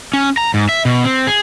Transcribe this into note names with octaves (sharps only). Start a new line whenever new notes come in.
C#4
A#5
G#2
E5
B2
C4
G#4